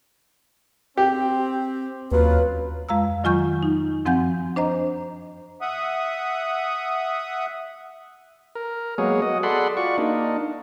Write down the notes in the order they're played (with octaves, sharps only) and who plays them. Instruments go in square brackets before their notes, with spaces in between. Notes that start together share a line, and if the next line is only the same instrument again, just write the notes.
[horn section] C4 [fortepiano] G4
[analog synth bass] D#2 [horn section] F#3 C#4 F4 [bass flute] B4
[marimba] F2 G#3 F5 A#5 E6
D#3 F#3 F4 G#5 C#6 G6
D#4
F#2 F3 C4 F#5 G#5 G6
D4 C5 D#5 A#5
[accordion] E5 F#5 D#6
[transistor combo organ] A#4
F#3 G#3 A#3 B3 G#4 C#5
F#4 D#5
G#4 A4 D5 F#5 B5 C6
F4 F#4 D5 C#6
A#3 D4 D#4